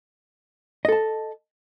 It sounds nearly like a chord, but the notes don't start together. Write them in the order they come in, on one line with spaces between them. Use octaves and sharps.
D#5 A4 A5